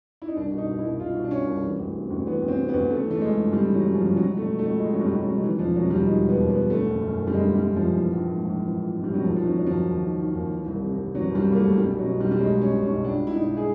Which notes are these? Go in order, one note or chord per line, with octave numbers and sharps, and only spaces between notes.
E4
D#4
C2 D4
B2
D#4
B2
E4
C2
C2 F4
B2
D4
B2 C#4
C2
E3
D2
C3
D2
E3 B3
D2
C4
C3
B3
D2
C#3 A3
E3
A3
F#2 G#3
G1
C#3 G3
E3 F#3
F#2
F3
G1
C#2 F#3
B2 A3
B2
A3
C#2
C#2 G#3
B2 F#3
G3
B2 G3
F#3
C#2
D#3 E3
E1 F3
D#2 F#3
E1 G3
D#3 G#3
E1
B3
D#2
B3
E1
D3 A3
F#1
F#2
F#1
G3
D3 G#3
F#1
G3
F#2
F#1 F3
E3
A#1
G#2
A#1
E3
A#1
G#2
A#1 G3
F#3
D#2 F3
F3
D#3 F#3
D#3 F#3
D#2 F3
D#2
D#3
D#3
D#2
E3
C2
C3
C2
E3 F#3
C2
G3
C3
A#3
A3
C2
B1 G3
B2
F#3
B2
G3
B1
G3
B1 G#3
B2
C#4
B2
C#4
B1
C#2 D4
B2
E4
B2 D#4
G#4